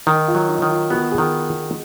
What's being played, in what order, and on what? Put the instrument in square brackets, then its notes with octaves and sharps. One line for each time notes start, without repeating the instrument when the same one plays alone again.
[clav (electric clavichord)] D#3 [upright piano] D#4
[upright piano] F4
[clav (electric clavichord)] F#3
[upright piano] D#4
[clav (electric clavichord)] D#3
[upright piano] F4
[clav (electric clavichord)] B3 [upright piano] F#4
[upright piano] G#4
[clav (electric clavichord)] D#3